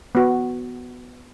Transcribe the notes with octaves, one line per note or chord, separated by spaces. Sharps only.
B3 F#4